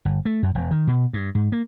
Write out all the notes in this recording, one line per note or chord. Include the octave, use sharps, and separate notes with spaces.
G1
A3
F#2
E1
D#3
B2
G2
G#2
A#3